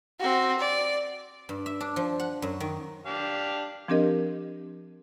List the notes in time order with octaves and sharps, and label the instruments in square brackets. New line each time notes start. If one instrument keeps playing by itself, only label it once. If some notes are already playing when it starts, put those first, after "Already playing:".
[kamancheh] C4 F#4
D5
[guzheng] G2
E5
D4
F3
F#5
F#2
D#3
[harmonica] D4 G4 F5
[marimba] F3 C4 D4 G4 A#4 D#5